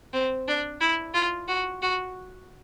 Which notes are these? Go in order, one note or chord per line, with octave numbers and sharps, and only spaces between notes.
C4
D4
E4
F4
F#4
F#4